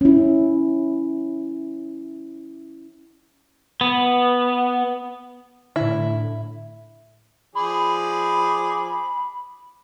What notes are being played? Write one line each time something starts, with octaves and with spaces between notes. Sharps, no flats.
C#4 E4
B3
A2 D3 E4
F3 G#4 D5 B5